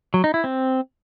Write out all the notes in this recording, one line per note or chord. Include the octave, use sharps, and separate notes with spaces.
F#3
D#4
E4
C4